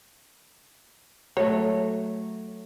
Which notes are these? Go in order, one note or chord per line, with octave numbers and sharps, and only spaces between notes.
F#3 A3 C#5